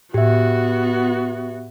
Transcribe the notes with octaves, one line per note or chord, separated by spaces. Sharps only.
A2 B3 F#4 G4 E5